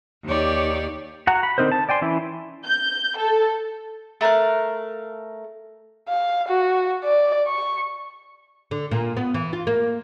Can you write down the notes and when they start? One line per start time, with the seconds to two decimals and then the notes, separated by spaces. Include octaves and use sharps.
0.25 D#2 G4 C#5 D5
1.27 F#4 F#5 A#5
1.43 B5
1.58 D3 C4 D#4 A#4 C5
1.72 A5
1.89 D5 G5 G#5 C6
2.02 E3 C#4 E4
2.65 G6
3.18 A4
4.21 A3 A#4 F5 F#6
6.09 F5
6.48 F#4
7.04 D5
7.47 C#6
8.71 D3
8.91 A#2
9.17 B3
9.34 E3
9.53 F4
9.67 A#3